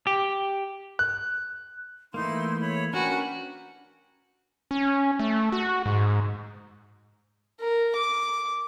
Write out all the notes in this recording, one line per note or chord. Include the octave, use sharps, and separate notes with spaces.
G4
F#6
E3 A3 A#3 D#4 E4 C6
C#5 B5
C#4 D4 F#4 A#4 B4 G5 G#5
C#4
A3
F#4
G#2
A#4
D6